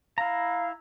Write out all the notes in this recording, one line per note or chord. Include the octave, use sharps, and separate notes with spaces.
E4 F5 A#5